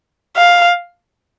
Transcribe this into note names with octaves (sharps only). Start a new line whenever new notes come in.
F5